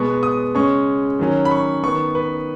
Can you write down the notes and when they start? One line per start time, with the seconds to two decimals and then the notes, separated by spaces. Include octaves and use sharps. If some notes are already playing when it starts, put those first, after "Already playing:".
Already playing: B2 G#3 B3 C#6
0.23 D#6
0.55 C#3 G#3 C#4 C#6
1.19 D#3 F#3 C#4
1.45 B5
1.51 C#6
1.83 D#3 B3 C#6
2.15 B4